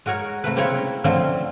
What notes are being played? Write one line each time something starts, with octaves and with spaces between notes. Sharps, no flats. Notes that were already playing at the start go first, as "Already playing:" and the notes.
G#3 F#4 A#4 C#5
C3 A3 B4
C#3 A#3 C4 E4 A#4 C#5
D3 F3 A3 C4 C#4